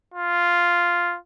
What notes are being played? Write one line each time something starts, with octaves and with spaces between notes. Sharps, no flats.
F4